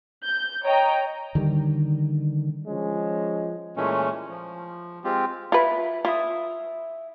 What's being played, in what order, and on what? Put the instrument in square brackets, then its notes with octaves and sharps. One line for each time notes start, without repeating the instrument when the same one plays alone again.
[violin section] G6
C#5 D#5 G5 A#5
[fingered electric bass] D3 D#3 G3
[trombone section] F3 G#3 C#4
[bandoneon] A#2 E3 G#3 A3 C#4
F3
G#3 C4 F4 G4
[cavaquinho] E4 B5 [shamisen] F4 B4
[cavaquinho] E4 E5 D#6 [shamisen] F4